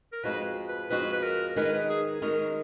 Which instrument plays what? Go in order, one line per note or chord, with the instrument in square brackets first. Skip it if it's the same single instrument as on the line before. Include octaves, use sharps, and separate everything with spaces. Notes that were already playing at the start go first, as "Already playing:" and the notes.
[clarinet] A#4
[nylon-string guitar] F2 F3 G#3 D#4 F#4 [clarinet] B4
[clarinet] B4
[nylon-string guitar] F2 F3 G#3 D#4 F#4 [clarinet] B4
[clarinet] B4
A#4
[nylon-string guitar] D#3 G#3 D#4 A#4 [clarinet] B4
[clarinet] B4
G#4
[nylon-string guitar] D#3 G#3 D#4 A#4 [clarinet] F#4